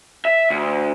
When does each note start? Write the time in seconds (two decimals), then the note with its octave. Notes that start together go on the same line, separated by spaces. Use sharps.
0.25 E5
0.50 D2